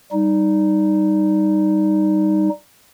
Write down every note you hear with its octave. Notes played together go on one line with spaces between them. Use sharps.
G3 D#4